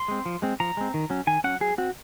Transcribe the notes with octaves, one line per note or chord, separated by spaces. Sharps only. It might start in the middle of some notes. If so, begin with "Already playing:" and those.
Already playing: C6
G#3 C4
F3
G#3 C4
F3 A#5
G#3 C4
D#3
F#3 C#4
D#3 G#5
F#3 C#4 F#5
F#3 G#4
C4 F#4